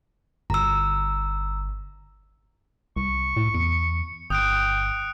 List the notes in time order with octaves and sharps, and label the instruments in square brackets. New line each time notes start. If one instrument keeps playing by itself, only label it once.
[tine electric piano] G1 [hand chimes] A#5 E6
[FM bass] C2 [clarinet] C#6
[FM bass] A2
[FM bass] E2 [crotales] C#7
[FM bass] G1 [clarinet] G5 [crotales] D#6 F#6 D7